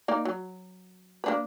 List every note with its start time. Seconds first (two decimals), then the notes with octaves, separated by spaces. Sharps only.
0.08 A#3 D#4 D5
0.25 F#3
1.24 A#3 D4 B4